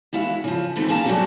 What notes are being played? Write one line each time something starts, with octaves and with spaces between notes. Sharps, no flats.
E2 G#3 E4 F#4 F5
C#3 F3
C3 D#3 E3 A3 B3 C4
A#3 C#4 G#4 F5 A5 A#5
F#3 G3 A3 C4 C#4 F#4